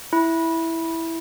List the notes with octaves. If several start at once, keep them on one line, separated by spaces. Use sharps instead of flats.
E4